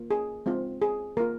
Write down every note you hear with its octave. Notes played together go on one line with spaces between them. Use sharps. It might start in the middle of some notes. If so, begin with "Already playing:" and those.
Already playing: A#3 F4
G#4
G#3 C4 F4
G#4
A#3 F4 A#4